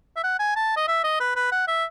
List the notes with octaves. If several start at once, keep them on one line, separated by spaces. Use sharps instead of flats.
E5
F#5
G#5
A5
D#5
E5
D#5
B4
B4
F#5
E5